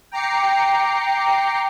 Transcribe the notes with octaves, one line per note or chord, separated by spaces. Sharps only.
G5 A#5 D6 C7 C#7